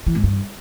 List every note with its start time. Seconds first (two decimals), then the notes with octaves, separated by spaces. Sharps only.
0.07 E3
0.15 G#2
0.23 G2